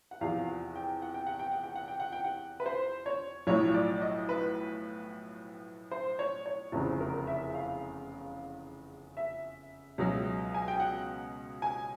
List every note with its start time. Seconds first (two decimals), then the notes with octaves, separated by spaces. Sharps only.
0.11 F#5
0.21 E2 C3 F3 F5
0.48 F#5
0.76 G5
1.02 F#5
1.14 G5
1.27 F#5
1.39 G5
1.51 F#5
1.63 G5
1.75 F#5
1.88 G5
2.00 F#5
2.12 G5
2.24 F#5
2.60 B4
2.66 C5
3.06 C#5
3.47 B1 A2 F3 C#5
3.74 D5
4.01 D#5
4.29 B4
5.91 C5
6.19 C#5
6.46 C#5
6.72 F1 E2 C#3 C5
7.01 A#4
7.27 E5
7.54 F5
9.17 E5
9.98 C#2 B2 F#3
10.54 G#5
10.68 G5
10.80 F#5
11.62 G#5